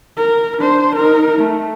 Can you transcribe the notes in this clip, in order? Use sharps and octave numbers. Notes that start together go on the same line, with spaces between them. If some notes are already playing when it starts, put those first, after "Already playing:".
A#4
D4 C5
D#4 A#4
A3